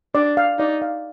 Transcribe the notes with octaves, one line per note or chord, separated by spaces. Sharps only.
D4 D5
F5
D#4 D5
F5